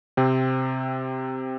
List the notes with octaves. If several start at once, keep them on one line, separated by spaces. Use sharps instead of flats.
C3 C4